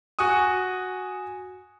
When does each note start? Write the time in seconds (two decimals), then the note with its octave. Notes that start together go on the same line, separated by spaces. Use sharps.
0.19 F#4 G#5 C#6 D#6